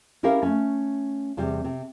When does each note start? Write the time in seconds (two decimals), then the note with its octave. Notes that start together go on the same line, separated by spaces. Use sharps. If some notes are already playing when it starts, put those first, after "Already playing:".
0.23 C#4 E4 G4 A#4 E5 F5
0.43 A3 C#4
1.37 E2 C3 G3
1.64 C3